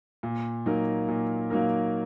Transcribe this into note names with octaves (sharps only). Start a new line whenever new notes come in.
A#2
F#3 A#3 D#4 A#4
A#2
F#3 A#3 D#4 A#4